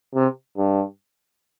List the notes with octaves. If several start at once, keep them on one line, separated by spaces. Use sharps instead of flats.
C3
G2